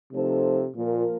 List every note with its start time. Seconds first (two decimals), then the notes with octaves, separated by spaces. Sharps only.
0.12 C3 F3 A3 D#4 A4 C5
0.76 A#2 F3 A#3 F4 A#4